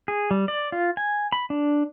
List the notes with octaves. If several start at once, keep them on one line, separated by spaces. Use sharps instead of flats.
G#4
G3
D5
F4
G#5
B5
D4